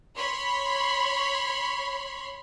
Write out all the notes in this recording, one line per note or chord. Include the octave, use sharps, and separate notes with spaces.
C#5 B5 C6